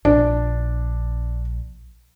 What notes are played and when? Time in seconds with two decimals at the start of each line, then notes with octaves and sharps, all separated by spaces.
0.05 A#1 D4